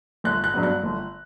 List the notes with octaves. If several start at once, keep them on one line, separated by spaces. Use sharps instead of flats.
G1 F#6
F#6
G2 F#3 B3
F#6
G1